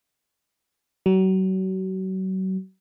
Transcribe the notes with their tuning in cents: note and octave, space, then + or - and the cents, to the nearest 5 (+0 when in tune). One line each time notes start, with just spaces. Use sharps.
F#3 +35